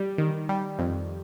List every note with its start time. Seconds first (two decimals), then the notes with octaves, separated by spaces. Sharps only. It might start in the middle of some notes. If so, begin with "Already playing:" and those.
Already playing: G3
0.18 D#3
0.49 G3
0.79 F2